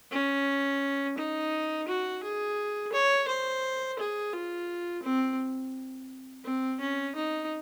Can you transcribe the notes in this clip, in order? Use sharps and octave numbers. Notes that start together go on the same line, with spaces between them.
C#4
D#4
F#4
G#4
C#5
C5
G#4
F4
C4
C4
C#4
D#4